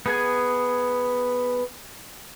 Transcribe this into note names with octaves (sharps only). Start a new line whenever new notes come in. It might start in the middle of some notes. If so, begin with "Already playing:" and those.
B3 G#4 G#5